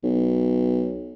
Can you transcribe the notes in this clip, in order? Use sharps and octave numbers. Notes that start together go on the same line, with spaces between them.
B1